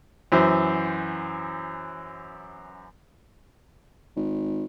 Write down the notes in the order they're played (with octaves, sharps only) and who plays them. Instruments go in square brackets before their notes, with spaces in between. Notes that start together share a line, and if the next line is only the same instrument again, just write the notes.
[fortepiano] F#2 E3 C5
[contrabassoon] G#1